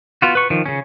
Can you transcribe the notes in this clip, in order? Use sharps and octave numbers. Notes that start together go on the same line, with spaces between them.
B3 F4 F#4
B4 C#6
D#3 F3
C#3 C#4